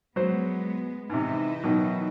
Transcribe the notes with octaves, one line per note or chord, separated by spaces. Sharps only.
F#3 G#3 B3 C5
G#2 C3 E3 D#4 E4
B2 D#3 F#3